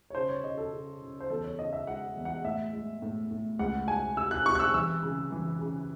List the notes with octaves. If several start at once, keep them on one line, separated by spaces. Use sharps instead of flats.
C#5
C#3 C5
C#5
C#3 D#5
A4
C#3
C#3
C5
E2 A4
C#5
C#3 D#5
E5
G#3 F#5
E2
F#5
A2 E5
G#3
A2
A2
C#2 F#5
C#2 G#5
C3 E6
F#6
C3 C#6
F#6
E6
E3 E6
C#3
E3
C#3